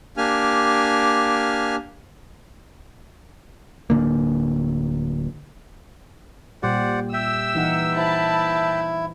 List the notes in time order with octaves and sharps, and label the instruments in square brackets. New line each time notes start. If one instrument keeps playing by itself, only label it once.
[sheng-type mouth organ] A#3 D4 G4 G#5 F6
[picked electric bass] D1 C2 D3 A#3
[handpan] A#2 G3 G4 [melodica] C5 D5 F#5
[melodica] E5 G5 [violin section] E6
[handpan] E3 D#4 F#5
[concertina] E4 [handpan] C5 [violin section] A5 B5